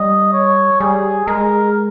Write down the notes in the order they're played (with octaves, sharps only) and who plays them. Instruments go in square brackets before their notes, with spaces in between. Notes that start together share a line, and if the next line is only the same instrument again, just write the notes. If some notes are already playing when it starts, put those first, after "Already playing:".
Already playing: [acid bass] G3 [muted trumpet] D#5
[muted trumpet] C#5
[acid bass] G3 [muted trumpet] G#4
[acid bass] G#3 [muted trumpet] A#4